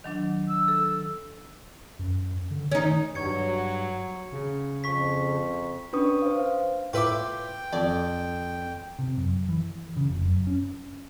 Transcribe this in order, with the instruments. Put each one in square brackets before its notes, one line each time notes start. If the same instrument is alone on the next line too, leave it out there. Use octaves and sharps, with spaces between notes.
[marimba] D#3 F#3 D4
[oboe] E6
[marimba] A4
[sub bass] F#2
D3
[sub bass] D#3 [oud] C#4 D#4
[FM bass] G2 [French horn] F#3 [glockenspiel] C#6 G#6 C#7
[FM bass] C#3
[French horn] F2 [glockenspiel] C#6 B6
[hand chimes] C#4 D4 B4 C#6 D#6
C5 F5
F5
[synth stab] A2 B4 [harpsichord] F4 E5 D6 [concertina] G5
[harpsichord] F2 [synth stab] D5
[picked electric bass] C3
F#2
E3
C#3
F1
F#2
C#4